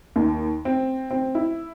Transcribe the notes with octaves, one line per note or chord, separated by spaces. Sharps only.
D#2
C4
C4
E4